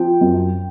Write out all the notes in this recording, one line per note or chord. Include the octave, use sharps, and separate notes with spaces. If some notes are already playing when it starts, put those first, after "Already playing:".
Already playing: F3 G5
F#2